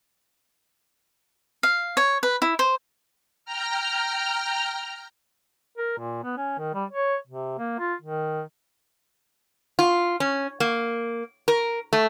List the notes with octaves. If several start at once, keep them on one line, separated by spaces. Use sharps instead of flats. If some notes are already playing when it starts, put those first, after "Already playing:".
F5
C#5
B4
E4
C5
G5 A#5 F6
A#4
A#2
B3
C#4
D#3
G3
C#5
C3
A#3
F4
D#3
F4
C#4
A#3
A#4
A3